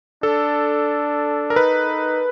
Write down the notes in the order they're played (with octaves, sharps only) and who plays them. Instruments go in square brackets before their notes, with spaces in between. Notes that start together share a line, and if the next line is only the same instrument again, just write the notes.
[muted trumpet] D4 [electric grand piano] A4
[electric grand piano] A#4
[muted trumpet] D#4 [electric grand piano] B4